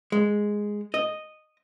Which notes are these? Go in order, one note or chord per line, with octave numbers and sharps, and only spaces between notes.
G#3
D#5